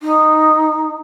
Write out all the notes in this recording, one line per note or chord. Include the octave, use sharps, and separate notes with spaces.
D#4